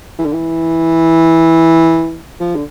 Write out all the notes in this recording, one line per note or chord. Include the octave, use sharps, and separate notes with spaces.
E3
D3
E3
F3
D3